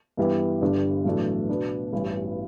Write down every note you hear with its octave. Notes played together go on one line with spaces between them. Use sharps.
G2 E3 B3 E4 G4
G1 G2 D3 G3 D4
B1 A2 E3 A3 D4
B2 B3 D4
A1 G2 E3